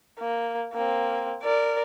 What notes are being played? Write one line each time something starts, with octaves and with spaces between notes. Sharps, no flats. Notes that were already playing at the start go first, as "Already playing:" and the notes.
A#3
A#3 C4
A#4 D5